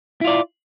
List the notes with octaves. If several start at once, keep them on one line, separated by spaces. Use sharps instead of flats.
E4 F4 D5